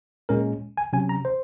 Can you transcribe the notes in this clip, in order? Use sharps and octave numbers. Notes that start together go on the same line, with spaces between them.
A#2 G#3 C#4 A#4
G#5
C3 F#3 C#4 G#5
A#5
C5